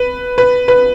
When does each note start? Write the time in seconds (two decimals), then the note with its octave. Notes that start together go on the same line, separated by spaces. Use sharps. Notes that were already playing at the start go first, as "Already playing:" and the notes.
Already playing: B4
0.38 B4
0.68 B4